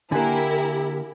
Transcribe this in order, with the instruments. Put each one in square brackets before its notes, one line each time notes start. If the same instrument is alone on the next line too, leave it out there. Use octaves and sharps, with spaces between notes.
[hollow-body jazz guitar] D3 A#3 [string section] E4 A#4 [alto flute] G4 [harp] E5 F#5 G#5